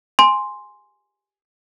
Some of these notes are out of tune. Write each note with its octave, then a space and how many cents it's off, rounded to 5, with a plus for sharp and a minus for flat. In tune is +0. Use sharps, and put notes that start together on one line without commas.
G#5 +0 C6 +0